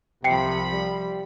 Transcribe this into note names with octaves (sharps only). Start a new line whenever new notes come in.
C2 C3 F3 G5 B5 C7 C#7
G3